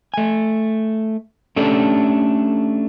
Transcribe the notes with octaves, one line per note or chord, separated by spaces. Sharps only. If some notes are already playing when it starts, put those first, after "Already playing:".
A3 G#5
A3 C#4 D4 G4 A4